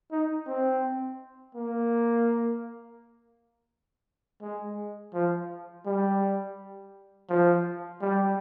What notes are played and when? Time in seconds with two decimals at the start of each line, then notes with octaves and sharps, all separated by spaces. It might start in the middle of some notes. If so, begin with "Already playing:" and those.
0.12 D#4
0.47 C4
1.55 A#3
4.42 G#3
5.14 F3
5.86 G3
7.30 F3
8.01 G3